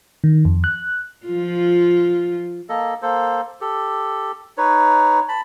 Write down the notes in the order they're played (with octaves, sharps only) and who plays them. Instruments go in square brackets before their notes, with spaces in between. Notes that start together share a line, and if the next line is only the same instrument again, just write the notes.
[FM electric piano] D#3
F2
F#6
[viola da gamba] F3 F4
[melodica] A#3 A4 D#5
A#3 A4 C5
G4 A4
D#4 B4 C#5
A5 B5